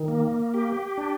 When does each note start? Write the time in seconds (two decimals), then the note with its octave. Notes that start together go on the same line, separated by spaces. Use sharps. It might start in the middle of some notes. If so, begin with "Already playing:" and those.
Already playing: D#3
0.08 A#3
0.54 G4
0.98 D4